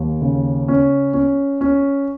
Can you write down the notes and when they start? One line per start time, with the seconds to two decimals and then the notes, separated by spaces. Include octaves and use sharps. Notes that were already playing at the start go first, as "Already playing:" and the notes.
Already playing: D#2
0.22 C#3
0.68 C#4
1.14 C#4
1.61 C#4